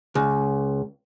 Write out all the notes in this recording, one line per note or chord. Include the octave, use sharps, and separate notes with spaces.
C#2